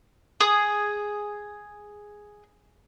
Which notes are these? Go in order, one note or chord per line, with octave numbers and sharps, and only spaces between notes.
G#4 D#6